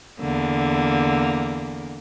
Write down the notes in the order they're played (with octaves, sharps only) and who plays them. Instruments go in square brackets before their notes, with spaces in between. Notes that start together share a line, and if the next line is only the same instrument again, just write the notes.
[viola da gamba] E2 D3 A#3